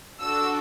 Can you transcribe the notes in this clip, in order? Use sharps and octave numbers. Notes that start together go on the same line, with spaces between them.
D4 F#4 A4 E6